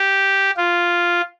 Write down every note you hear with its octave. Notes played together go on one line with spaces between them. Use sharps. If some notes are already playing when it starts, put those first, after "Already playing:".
Already playing: G4
F4